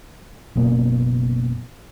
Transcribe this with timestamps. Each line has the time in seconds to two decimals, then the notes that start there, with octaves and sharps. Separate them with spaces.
0.56 F#1 B2 A#3 C#4